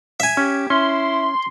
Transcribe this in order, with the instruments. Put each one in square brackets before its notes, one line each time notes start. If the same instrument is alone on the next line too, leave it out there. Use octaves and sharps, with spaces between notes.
[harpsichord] E5 G#5
[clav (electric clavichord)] C#4 [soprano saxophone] G4
[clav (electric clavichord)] C#4 [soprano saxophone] E4 [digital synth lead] C6